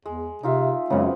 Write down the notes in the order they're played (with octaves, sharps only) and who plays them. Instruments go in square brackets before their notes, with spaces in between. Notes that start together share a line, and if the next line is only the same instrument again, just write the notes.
[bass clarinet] E2 [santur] G#3
[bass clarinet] C3 [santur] D#4 F4 E5
[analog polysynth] F#2 C#3 [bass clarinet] G#3 [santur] B3 C4